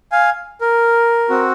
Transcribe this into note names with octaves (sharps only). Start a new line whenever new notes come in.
F5 G#5
A#4
C4 F#4